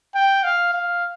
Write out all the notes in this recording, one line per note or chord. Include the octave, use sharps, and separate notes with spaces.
G5
F5
F5